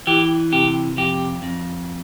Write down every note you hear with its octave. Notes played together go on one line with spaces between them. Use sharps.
E3 G4
C3 G4
F2 G4
F2